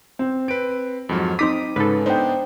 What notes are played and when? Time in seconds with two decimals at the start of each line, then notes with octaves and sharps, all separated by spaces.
0.19 C4
0.48 C4 B4 D7
1.09 F2 G#2 F#3
1.39 C4 D#4 D6 D#6 B6
1.76 G#2 C#3 A4 B4
2.06 B3 D4 D#4 C5 G5